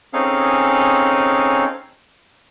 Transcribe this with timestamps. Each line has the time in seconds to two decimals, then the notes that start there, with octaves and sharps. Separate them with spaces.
0.13 C4 C#4 D#4 G#4 A4 F5